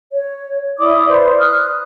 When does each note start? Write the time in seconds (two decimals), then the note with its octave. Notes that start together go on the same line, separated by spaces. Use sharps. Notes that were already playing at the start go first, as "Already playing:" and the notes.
0.11 C#5
0.79 E4 D5 D6 D#6
1.08 B4 C5 D5
1.39 D#6 F6 F#6